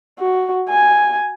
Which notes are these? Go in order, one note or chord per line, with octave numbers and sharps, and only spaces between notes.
F#4
G#5